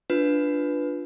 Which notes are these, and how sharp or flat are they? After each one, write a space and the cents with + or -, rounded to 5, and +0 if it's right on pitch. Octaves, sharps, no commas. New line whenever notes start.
D4 +0 F4 +0 B4 +0